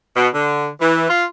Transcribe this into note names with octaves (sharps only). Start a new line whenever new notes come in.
B2
D3
E3
F4